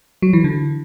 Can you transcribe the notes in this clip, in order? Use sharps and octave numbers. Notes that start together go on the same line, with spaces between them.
F#3
E3
D3